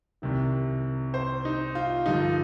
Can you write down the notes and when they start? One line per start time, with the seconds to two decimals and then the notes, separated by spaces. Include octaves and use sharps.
0.22 C2 C3 D#3
1.14 C5
1.45 D#4
1.75 F4
2.06 G2 D3 F3 D#4